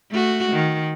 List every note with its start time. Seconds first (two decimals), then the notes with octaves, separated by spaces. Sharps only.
0.11 A3 F#4
0.52 D#3